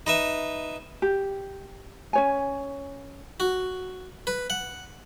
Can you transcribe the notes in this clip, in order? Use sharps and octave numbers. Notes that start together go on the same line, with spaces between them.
D#4 B4 E5
G4
C#4 C#5 G#5
F#4
B4
F#5